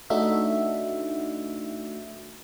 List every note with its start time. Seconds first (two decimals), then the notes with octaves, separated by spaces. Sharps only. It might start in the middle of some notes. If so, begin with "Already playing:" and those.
0.10 A3 D4 D#4 F#4 E5